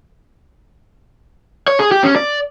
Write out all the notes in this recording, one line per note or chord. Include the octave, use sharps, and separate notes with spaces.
C#5
G#4
G4
C#4
D5